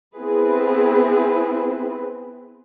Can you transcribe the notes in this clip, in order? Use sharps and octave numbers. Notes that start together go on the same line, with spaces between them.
B3 C4 E4 G#4 B4